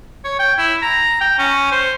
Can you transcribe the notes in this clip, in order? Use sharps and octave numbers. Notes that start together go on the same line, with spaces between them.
C#5
G5
E4
A#5
G5
C#4
C5